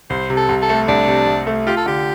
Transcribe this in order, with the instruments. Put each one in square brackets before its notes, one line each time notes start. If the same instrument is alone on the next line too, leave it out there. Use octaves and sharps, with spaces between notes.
[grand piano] C2 [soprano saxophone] C5
[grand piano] C3
[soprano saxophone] A4
[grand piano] C2
[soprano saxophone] A4
[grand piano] A3
[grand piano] C2 [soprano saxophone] D4
[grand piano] C3
C2
A3
[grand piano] F4 [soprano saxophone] G4
[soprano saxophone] A4
[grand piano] D3 [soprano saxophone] G4